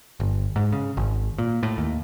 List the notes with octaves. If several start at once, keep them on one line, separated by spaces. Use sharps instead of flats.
G1
G#2
C#3
G#1
A#2
A2
D#2